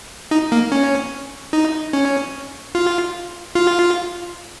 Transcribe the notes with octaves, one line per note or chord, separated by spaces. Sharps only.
D#4
A#3
C#4
D#4
C#4
F4
F4